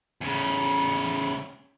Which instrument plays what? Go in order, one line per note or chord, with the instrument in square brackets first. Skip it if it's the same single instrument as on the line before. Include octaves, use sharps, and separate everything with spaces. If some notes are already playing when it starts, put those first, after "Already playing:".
[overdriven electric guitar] E2 C#3